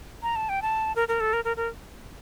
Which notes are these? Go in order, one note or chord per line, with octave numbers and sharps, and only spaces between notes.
A#5
A5
G5
A5
A#4
A#4
A4
A#4
A#4
A#4